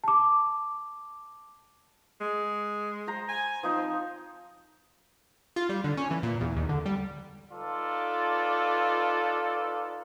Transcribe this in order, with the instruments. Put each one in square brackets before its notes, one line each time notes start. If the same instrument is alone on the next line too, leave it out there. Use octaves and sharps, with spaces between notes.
[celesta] A5 D6
[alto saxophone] G#3
[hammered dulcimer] C5 A#5
[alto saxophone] G#5
[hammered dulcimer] F3 D#4 [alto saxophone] C4
[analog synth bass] F4
G3
D3
C#4
E3
A#2
E2
D#2
D3
G3
[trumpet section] D#4 F4 A4 B4 D5